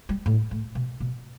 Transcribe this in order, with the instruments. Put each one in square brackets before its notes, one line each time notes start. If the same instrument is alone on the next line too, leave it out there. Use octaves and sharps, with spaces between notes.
[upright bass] G3
A2
A2
B2
B2